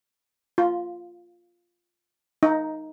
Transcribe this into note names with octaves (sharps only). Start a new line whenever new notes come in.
F4
D#4